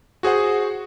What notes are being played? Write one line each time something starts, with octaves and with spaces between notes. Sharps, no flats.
F#4 G#4 C5 F#5